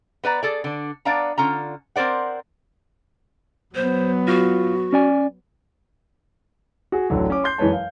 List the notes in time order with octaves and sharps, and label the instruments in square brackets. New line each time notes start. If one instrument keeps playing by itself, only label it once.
[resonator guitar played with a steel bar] B3 B4 D5 A#5
G#4 A4 D5
D3 D4
B3 D4 D5 F5 A5 A#5
D3 C#4 F4 A#5
C4 A#4 C5 D5 F#5
[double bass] F#3 B3 [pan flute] C5
[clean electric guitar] F4 [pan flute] F#4
[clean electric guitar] C#4 D5 G#5
[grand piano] F#4 G#4
D1 A1 D3 F#3
C#4 D6
C6 G6 C7
F#2 E3 G#3 B4 C#5 A5
F5